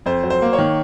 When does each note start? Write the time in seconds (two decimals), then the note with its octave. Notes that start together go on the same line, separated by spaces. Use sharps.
0.06 F2 C5
0.24 F#3
0.30 C5
0.42 A#3
0.53 C#5
0.58 D#3